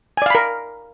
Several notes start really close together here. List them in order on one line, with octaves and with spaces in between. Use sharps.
G#5 D5 F5 B5 A#4